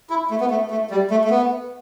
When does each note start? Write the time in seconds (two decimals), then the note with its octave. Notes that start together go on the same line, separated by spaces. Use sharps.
0.10 E4
0.30 A3
0.40 B3
0.50 A3
0.71 A3
0.90 G3
1.10 A3
1.24 A3
1.30 B3